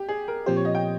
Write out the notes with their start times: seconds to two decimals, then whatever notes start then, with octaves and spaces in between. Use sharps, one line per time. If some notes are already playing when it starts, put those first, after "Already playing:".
Already playing: G4
0.09 G#4
0.28 A#4
0.46 A#2 F3 C4 G4 C5
0.56 C#5
0.65 D#5
0.75 G5